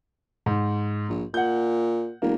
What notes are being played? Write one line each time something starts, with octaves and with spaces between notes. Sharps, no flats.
G#2
A#1
A#2 F#5 G6
E1 A#3